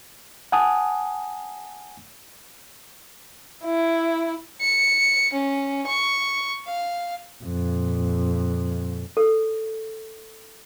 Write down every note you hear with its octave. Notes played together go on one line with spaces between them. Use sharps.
F#5 G#5 A5 D#6
E4
C#7
C#4
C#6
F5
F2 A#2
A4